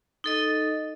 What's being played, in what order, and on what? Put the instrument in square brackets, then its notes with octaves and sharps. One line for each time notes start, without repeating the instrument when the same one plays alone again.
[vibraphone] D#4 A4 D#5